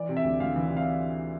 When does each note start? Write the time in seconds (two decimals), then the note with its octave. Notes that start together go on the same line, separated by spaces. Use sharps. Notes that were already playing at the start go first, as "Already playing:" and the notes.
Already playing: E3 D5
0.09 C3
0.17 E5
0.24 D2
0.40 D2 F5
0.56 E3
0.70 C3
0.77 F5